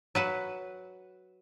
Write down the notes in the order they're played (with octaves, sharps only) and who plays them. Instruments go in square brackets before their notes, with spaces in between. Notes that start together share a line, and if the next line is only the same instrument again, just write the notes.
[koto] F#3 B4 F#5